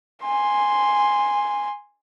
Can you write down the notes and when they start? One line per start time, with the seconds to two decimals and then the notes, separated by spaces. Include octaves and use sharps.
0.24 G#5 C6